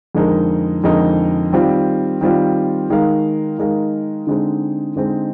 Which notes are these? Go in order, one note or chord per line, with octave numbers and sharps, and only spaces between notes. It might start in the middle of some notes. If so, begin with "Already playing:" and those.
F2 D3 G#3 D#4 A#4
F2 D3 G#3 D#4 A#4
D#3 G3 C4 F4
D#3 G3 C4 F4
D#3 G#3 D#4 A#4 F5
D#3 G#3 D#4 A#4 F5
D3 G#3 C4 D#4
D3 G#3 C4 D#4